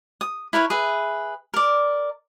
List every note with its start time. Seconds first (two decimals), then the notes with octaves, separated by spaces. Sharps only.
0.21 D#6
0.53 E4 A#4 B4 C#5
0.70 G#4 B4 E5
1.54 A#4 D5